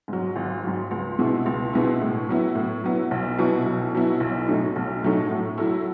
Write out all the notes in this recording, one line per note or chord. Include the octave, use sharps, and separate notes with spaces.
G#2 F#3
G#1
G#2 F#3
C#2
B2 G#3 B3 E4
C#2
B2 G#3 B3 E4
A2
F#3 B3 E4
A2
F#3 B3 E4
B1
B2 F#3 B3 E4
B1
B2 F#3 B3 E4
B1
A2 F#3 A3 D#4
B1
A2 F#3 A3 D#4
A2
F#3 A3 E4